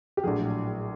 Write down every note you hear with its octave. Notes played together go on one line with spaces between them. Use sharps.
G4
A#1 A2 F#3 G#4